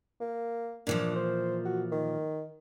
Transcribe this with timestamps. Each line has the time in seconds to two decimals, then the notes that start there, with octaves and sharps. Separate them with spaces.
0.21 A#3
0.87 A#2 E3 F3 D4
1.16 C5
1.65 F#4
1.92 D#3